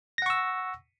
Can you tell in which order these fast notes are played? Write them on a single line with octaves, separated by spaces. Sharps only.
A#6 F#5 C#6 E6